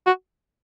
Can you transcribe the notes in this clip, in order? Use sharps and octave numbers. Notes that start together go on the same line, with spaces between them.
F#4